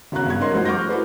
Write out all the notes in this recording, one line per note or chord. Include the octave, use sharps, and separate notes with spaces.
G#1 E2 C#3 F#4 A#5 F#6
G2 B2 G#6
C#4 D#4 A#4 C#5 D#5 C6
F3 G3 A3 F#4 C5
C#6 D6 F6 G6 A#6
E4 F#4 A4 B4 C5